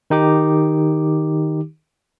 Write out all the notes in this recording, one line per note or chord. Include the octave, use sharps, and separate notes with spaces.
D#3 D#4 G4 D6